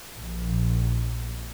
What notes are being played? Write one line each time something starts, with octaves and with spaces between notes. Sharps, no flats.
A#1